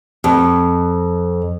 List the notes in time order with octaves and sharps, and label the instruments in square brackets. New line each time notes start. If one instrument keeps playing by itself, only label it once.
[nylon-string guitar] F2